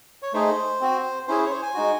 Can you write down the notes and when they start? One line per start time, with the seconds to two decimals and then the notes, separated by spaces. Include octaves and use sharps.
0.22 C#5
0.33 A3 D#4 G#4 C5
0.81 C4 F#4
1.28 C#4 E4 G#4 C5
1.46 C#5
1.51 C5
1.63 G#5
1.75 G#3 D#4 F#4